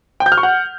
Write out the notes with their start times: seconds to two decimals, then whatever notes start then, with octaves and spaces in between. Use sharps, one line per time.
0.20 G5
0.26 G6
0.32 F6
0.38 C#6
0.43 F#5